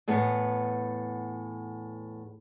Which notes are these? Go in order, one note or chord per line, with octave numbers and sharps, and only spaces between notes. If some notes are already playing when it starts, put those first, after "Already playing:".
E2 A2 B3